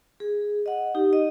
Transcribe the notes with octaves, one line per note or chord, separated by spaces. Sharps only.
G#4
D#5 F#5
D#4 G4
D#5